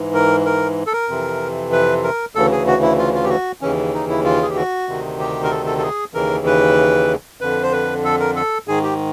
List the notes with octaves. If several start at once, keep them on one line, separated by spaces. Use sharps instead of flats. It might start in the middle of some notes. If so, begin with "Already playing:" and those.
Already playing: G#2 E3
A#4
A#4
A4
A#4
F2 C3 E3
B4
A#4
D2 C#3 E3 A4
G#4
F#4
E4
F4
F4
G4
F#4
D#2 C#3 E3 C#4
D#4
E4
F4
G#4
G4
F#4
D2 C3 D#3
G4
A#4
A4
A4
A4
G#4
D#2 C#3 E3 A#4
B4
F2 D3 B4
C5
B4
A4
A#4
A4
G#2 D#3 G#4
G4